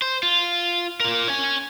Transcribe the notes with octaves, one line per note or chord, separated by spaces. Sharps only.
C5
F4
F4 A#4
C#5 G#5